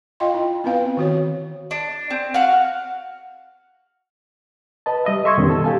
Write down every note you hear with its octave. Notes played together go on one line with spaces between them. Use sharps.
F4 D#5 F5 G5 C6
E4
B3 C4 E4 B4 F5
D#3 F#4 C#5
D4
C4
F#4 F5
B4 D#5 A5
G3 D#5 E5
A4 E5 C6 C#6 E6 G#6
F2 B2 D#3 G3 B3 C#4
A4 E6
G4 A4 F5 G#5 A5